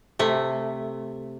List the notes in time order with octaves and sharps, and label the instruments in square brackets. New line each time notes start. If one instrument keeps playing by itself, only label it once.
[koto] C3 A3